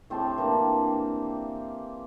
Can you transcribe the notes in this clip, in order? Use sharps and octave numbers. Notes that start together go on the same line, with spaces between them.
A2 C4 G4 A5
E3 A#3 D4